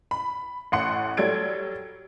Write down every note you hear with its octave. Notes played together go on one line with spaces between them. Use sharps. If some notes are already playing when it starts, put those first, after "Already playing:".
B5
A1 A2 F#5 C6 C#7
F#3 G3 A4 G#6 D7